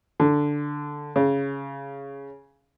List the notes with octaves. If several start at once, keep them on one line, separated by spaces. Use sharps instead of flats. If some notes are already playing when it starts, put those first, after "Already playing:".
D3
C#3